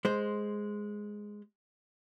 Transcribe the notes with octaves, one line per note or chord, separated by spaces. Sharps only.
G#3 C5